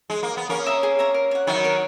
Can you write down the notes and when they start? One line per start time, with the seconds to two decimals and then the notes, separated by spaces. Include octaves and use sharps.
0.10 G#3
0.23 A#3
0.37 B3
0.49 A#3 C#4 A#4
0.66 E5 A#5 D#6
0.83 G#4
0.99 C#5 E5 A#5
1.14 A#4
1.31 C#5 F#5
1.47 D#3 F#3 E4
1.64 A#4 C#5 F#5